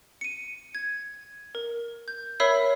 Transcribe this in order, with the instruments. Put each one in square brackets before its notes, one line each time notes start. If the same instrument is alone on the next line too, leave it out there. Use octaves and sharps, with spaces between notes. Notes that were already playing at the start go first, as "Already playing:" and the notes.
[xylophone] C#7 D#7
G#6
A#4
G6
A#4 C#5 E5 B5 E6 C7